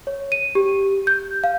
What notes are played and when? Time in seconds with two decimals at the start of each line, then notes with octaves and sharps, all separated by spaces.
0.07 C#5
0.32 D#7
0.55 G4
1.07 G6
1.44 F5